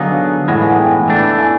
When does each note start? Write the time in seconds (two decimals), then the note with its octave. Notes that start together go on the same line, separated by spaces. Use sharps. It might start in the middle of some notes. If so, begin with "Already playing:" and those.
Already playing: D3 F#3 B3 D#4 G#4 F5
0.48 A2 E3 G#3 F#5
0.63 G#5
0.72 F#5
0.79 G5
1.08 E3 A3 D4
1.38 G#5